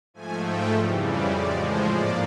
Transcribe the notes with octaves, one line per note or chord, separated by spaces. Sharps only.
G#2 F3 A3 G#5
G5
F2 C#3 E3 G3
D5
A2 F3 G#3 D5
C5
G#2 F3 A#3 D5